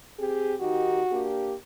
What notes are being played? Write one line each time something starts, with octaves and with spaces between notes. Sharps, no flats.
C4 G4 G#4
D#3 D#4 F#4 G4
A#3 D4 G4